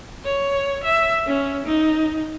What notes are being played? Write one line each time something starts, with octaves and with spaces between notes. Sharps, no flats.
C#5
E5
C#4
D#4